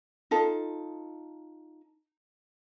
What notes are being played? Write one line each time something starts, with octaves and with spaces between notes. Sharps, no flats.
D#4 F4 A4